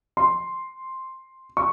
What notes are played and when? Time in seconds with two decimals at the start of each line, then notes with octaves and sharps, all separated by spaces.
0.17 C6
1.57 C#6